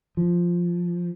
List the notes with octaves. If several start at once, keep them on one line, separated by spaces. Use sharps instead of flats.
F3